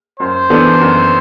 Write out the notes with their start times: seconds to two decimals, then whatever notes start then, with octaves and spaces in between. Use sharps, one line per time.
0.19 F#2 C5
0.50 E3 B3 D4 A4
0.81 F#2